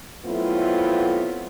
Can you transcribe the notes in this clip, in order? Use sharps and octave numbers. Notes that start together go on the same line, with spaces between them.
F#3 A3 B3 C4 E4 F4